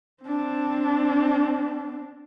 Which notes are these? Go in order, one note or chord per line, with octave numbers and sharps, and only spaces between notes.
C4 D4